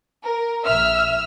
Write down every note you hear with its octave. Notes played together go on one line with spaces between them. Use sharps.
A#4
A#1 E5 E6 F6